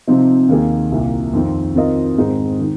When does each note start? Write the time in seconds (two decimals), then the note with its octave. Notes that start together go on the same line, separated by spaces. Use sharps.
0.07 C3 F3 C4 D#4
0.49 D#2 D#3 A#3 G#4
0.92 C2 A#2 A#3
1.33 F2 D#3 C4
1.75 D#3 C4 F4 A#4 D#5
2.18 G#2 D#3 G#3 C4 D#4
2.61 D#3